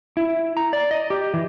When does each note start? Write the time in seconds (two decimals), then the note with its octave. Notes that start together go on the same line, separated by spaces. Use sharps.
0.17 E4
0.57 A#5
0.73 D5
0.91 D#5
1.10 G4
1.34 E3